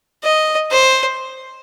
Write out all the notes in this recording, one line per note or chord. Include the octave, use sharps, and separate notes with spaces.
D#5
C5